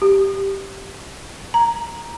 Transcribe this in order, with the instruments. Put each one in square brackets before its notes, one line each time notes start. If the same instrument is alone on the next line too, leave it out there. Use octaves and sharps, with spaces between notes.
[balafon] G4
A#5